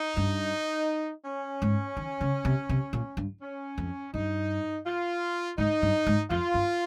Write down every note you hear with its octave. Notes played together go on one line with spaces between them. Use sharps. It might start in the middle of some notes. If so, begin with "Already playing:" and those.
Already playing: D#4
G2
C#4
G#2
D#3
C#3
C3
C3
A#2
G2
C#4
F2
G2 D#4
F4
G#2 D#4
G2
G#2
F2 F4
G2